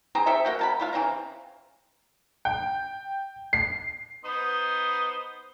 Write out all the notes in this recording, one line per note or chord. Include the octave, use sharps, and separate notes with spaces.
C4 G#4 C5 A#5
G4 A4 C5 E5
A#3 F#4 G5
A#4 A5 B5
A3 F4 F5
C#3 E3 C4 A#5
G5
C7
B3 D#4 C5